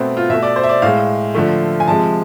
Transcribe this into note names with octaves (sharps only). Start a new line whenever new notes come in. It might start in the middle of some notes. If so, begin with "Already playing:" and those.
Already playing: B2 A3 B3 C4
F4
B2 A3 E5
D5
C5
E5
D5
A2 G#3 F5
D3 F3 A3
G#5
C3 F3 G#3 A5